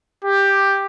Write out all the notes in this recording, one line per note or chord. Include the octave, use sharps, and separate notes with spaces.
G4